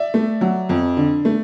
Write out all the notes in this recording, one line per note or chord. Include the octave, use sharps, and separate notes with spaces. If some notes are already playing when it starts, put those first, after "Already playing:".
Already playing: D5 E5
A3
F#3
F2
D3
A3